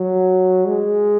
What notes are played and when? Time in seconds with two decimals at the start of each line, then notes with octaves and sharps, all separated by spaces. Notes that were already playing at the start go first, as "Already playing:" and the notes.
Already playing: F#3
0.67 G#3